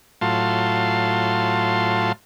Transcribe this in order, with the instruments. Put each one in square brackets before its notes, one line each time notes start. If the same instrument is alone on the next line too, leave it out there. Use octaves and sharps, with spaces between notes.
[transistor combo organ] A2 F#3 F4 A5 C6